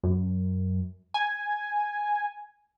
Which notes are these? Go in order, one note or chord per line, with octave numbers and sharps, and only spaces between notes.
F#2
G#5